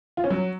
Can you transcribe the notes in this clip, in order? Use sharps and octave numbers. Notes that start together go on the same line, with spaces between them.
F4
C#4
F#3